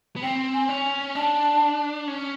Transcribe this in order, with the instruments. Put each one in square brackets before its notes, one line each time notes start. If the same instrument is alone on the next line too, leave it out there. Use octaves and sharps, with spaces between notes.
[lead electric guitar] B3
[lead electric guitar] C4 [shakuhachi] G5
[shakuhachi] G#5
[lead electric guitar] C#4
[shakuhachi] G#5
[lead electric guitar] D4 [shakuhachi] A5
[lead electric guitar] C#4